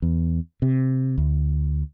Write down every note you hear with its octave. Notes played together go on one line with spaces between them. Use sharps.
E2
C3
D2